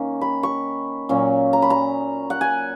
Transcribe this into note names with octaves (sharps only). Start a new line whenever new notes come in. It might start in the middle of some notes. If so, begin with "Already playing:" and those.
Already playing: D#3 A#3 C#4
B5
C#6
A#2 F#3 C#4
A#5
B5
A#5
F#5
G#5